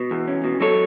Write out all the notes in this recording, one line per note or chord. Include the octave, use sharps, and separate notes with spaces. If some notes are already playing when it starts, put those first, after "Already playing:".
Already playing: B2
E2
C#4
B2
F#3 A4 C#5